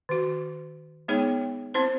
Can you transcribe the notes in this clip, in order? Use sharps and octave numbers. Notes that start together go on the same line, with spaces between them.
D#3 F#4
G#3 B3 D#4 G#4 C#5 G5
C4 E4 C5